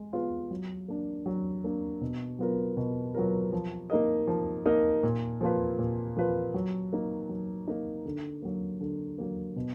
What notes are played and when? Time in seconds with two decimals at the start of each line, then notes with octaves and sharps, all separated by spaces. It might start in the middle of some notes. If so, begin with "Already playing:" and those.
Already playing: G#3
0.13 B3 F4 G#4 B4
0.51 F#3
0.88 A#3 D4
1.26 F#3
1.64 A#3 D4
2.01 B2
2.39 F#3 B3 F4 A#4
2.77 B2
3.14 F#3 B3 F4 A#4
3.53 F3
3.90 A#3 D#4 A#4 D#5
4.27 F3
4.66 A#3 D#4 A#4 D#5
5.03 A#2
5.41 F3 A#3 F4 B4
5.79 A#2
6.17 F3 A#3 F4 B4
6.54 F#3
6.93 A#3 D#4
7.29 F#3
7.67 A#3 D#4
8.06 D3
8.42 F#3 A#3
8.81 D3
9.18 F#3 A#3
9.56 B2